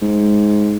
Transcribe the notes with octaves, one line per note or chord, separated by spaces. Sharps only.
G#2